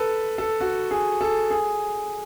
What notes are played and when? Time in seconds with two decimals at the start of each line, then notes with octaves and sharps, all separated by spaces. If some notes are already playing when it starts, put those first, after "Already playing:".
Already playing: A4 B4
0.38 A4
0.61 F#4
0.91 G#4
1.21 A4
1.50 G#4